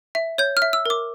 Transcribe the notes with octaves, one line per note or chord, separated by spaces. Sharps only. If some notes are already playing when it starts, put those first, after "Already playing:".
E5
C#5 G6
F6
E5
E6
A#4 D6